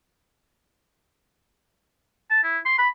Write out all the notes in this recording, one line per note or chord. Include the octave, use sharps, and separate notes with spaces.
A5
E4
C6
B5